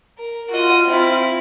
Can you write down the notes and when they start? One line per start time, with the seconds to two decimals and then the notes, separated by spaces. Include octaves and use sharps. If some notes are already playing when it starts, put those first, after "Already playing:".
0.18 A#4
0.50 F4 F#4 D#5
0.85 C4 E4